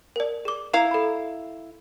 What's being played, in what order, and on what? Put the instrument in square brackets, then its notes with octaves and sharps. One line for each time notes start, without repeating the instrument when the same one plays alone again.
[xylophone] A#4 D5
G#4 D6
[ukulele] E4 F5 [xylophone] A#5
[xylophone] A4 B5